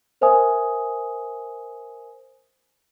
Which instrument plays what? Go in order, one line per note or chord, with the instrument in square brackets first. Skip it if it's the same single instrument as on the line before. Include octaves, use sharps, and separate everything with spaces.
[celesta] A#4 C5 E5 G#5 D#6